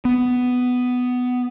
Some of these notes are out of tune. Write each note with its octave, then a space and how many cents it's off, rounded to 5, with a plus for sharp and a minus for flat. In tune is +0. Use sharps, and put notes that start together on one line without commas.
B3 +10